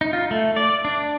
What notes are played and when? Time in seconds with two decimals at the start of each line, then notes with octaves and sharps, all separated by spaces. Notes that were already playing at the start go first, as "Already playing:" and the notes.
0.01 D#4
0.13 F4
0.31 A3
0.56 D5
0.85 D4